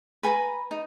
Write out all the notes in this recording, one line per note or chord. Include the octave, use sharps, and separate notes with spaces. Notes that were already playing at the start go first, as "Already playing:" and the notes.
B4 G#5 A#5 B5
D#4